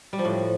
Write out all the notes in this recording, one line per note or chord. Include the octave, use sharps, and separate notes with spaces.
G3
F3
A2